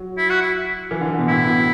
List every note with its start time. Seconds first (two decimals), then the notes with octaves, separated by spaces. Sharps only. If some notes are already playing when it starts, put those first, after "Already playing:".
Already playing: F#3
0.18 E4
0.30 F#4
0.42 E4
0.91 E3
1.01 D3
1.10 E3
1.18 B2
1.28 A2 E4
1.46 B2